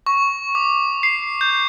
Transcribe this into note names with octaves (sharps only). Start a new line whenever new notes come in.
C#6
D6
C7
G6